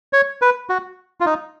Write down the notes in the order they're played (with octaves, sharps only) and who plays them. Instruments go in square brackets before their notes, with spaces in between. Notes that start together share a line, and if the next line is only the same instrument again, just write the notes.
[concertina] C#5
B4
F#4
F4
D#4